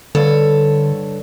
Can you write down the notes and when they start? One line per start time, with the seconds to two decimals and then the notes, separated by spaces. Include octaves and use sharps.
0.15 G2 D3 A4 C#5